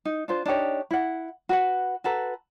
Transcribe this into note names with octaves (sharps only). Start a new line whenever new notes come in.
D#4
D4 F4 C5
D4 D#4 G4 C#5
E4 F#5
F#4 B4 F#5
F#4 A4 B4 A#5